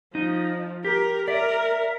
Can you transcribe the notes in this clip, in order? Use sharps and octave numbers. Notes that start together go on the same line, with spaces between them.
F3 D#4
G4 A#4
A#4 D5 E5